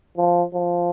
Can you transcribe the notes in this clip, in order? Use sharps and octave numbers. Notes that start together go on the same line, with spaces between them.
F3
F3